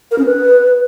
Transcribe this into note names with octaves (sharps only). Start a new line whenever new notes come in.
A#4
C#4
B4